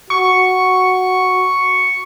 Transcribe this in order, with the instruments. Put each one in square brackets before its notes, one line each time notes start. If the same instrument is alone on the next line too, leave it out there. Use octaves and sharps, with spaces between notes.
[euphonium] F#4 [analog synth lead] C#6